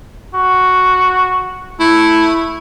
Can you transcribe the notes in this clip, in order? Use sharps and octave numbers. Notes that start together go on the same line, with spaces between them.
F#4
A3 E4